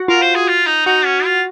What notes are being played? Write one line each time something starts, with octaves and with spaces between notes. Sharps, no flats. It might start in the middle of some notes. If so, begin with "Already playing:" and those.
Already playing: F#4
F4 A#4
C5
G#4
F4
D#4
D#4 F#4
C#4
F4